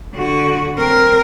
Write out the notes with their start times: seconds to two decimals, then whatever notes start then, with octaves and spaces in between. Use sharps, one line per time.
0.14 D3 F#4
0.75 C4 A#4